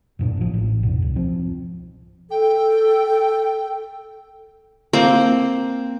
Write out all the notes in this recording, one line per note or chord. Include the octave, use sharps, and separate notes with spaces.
F#2 A#2 D4
A1 F3
A1
E2 G#2 B2
C#2
F3 C4
A4 G5
A#3 C4 C5